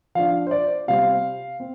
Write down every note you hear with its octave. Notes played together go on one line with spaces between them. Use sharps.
F3 D4 F5
C5
D5
C3 G3 C4 F5
C4